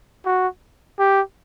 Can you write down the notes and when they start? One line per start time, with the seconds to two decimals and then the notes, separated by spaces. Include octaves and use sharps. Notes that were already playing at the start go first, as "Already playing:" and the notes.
0.26 F#4
0.99 G4